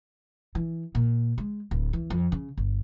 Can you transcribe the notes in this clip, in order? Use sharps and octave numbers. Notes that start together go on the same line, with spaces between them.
E3
A#2
G#3
D1
E3
F2
C#3
G1